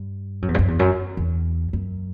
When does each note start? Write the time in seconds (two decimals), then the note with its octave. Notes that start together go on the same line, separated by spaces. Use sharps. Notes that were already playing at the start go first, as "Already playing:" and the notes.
Already playing: G2
0.42 F#2
0.48 E2
0.55 G2
0.59 F#2
0.68 E2
0.79 F#2
1.17 E2
1.73 F#2